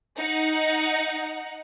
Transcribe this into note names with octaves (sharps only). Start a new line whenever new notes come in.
D#4 F#5